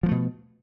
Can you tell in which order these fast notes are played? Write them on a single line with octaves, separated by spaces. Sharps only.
F3 G#3 A3 B2